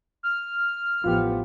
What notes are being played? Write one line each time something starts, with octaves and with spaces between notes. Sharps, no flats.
F6
A1 F3 B3 F4 G4